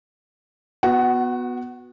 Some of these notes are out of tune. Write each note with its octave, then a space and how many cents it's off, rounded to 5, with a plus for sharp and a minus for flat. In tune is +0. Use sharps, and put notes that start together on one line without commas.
B3 +0 F#4 -20 F#5 +20